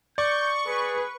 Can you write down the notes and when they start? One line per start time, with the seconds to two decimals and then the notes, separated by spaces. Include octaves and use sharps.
0.18 D5 C#6 G6
0.66 G#4 B4